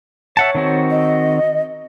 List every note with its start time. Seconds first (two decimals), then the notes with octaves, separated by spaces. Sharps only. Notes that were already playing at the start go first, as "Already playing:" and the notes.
0.37 C#5 E5 F#5 A5
0.55 D#3 C4 F#4
0.90 D#5